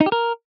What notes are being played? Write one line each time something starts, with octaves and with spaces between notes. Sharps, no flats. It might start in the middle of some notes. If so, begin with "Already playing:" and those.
D#4
G4
A#4